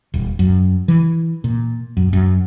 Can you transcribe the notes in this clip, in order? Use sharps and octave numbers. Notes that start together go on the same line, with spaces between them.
D#1
F#2
E3
A#2
F#2
F#2